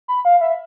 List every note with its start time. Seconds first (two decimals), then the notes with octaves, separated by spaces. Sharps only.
0.08 B5
0.25 F5
0.41 E5